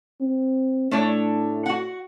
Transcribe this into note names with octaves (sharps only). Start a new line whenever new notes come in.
C4
A2 A3 D4 C#5
F#4 F#5